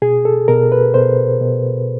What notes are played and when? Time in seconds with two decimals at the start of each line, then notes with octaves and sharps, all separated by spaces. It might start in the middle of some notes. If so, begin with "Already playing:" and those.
0.02 B2 G#4
0.25 A4
0.48 B2 A#4
0.72 B4
0.94 B2 C5
1.41 B2